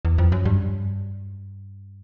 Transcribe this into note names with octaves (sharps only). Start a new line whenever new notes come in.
E2
F2
F#2
G2